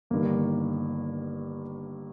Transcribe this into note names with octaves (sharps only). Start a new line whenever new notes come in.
G1 G2 D#3 A#3